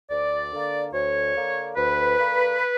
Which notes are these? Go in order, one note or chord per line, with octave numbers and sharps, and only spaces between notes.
D2 D5
D3 A#3
D2 C#5
D3 A#3
D2 B4
D3 A#3